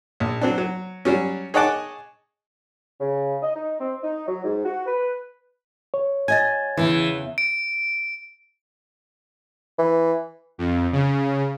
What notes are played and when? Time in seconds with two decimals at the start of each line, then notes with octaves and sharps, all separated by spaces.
0.20 A#1
0.41 F#3 C4 D4
0.58 F#3
1.05 F#3 G3 C#4
1.54 G#4 C#5 D#5 F#5 A5 D6
3.00 C#3
3.42 D#5
3.55 D#4
3.80 C4
4.02 D#4
4.27 F#3
4.44 G#2
4.65 F#4
4.86 B4
5.94 C#5
6.28 F#4 D#5 G#5 G#6 A6
6.77 E2 A#2 C#3 E3
7.38 D7
9.78 E3
10.58 F2
10.92 C#3